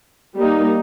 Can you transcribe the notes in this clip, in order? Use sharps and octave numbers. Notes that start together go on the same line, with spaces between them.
G3 A#3 D#4